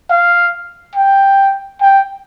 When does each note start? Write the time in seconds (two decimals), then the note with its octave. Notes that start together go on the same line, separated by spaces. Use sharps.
0.10 F5
0.95 G5
1.81 G5